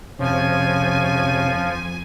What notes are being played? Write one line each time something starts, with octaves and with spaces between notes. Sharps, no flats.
F2 C3 F3 C#4 G#5